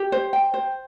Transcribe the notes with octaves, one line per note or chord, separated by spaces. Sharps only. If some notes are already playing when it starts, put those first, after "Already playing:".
Already playing: G4
C5
G5
C5